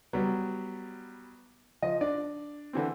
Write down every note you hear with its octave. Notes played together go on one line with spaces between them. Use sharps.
F#3 G3 B3
F3 D#5
D4 D5
D3 E3 C4